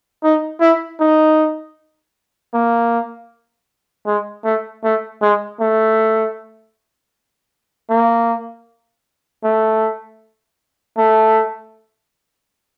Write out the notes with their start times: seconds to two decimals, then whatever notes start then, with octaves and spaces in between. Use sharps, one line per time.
0.24 D#4
0.61 E4
1.00 D#4
2.54 A#3
4.07 G#3
4.45 A3
4.84 A3
5.22 G#3
5.60 A3
7.91 A#3
9.44 A3
10.98 A3